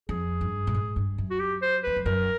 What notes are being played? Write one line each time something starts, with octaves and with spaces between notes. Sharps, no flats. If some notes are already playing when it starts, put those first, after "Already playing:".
F2 G#4
G2
A2
G#2
G2
F#2
F#4
G4
C5
E2 B4
F2
F#2 A#4